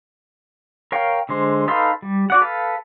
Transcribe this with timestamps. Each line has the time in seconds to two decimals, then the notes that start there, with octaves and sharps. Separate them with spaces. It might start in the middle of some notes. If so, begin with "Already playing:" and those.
0.92 A#4 C#5 F5 G5
1.29 D3 G#3 C5
1.68 D#4 A4 B4 F5 C6
2.02 G3
2.30 F#4 D5 F#5
2.41 A4 B4 F5